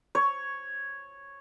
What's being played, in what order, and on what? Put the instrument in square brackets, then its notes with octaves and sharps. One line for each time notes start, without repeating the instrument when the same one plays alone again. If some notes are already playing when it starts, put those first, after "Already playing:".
[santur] C#5